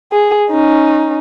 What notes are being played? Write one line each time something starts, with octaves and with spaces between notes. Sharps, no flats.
G#4
C#4 D#4